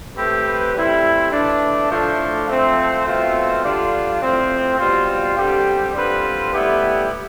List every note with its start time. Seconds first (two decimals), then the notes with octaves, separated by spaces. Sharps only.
0.16 A3 C4 G4 B4
0.74 A2 G3 C4 E4
1.32 E3 A3 D4
1.90 A2 F3 A3 D4
2.48 F3 A3 C4
3.06 B2 A3 C4 F4
3.64 D3 G3 D4 F4
4.21 A2 F3 C4
4.79 B2 G3 C4 F4
5.37 D3 G3 C4 G4
5.94 D3 G3 C4 F4 B4
6.53 A2 G3 B3 E4 G4